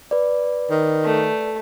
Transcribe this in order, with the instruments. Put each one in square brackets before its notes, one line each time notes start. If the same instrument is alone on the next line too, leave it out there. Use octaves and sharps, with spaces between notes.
[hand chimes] B4 D5
[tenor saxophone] D#3
[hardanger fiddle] A3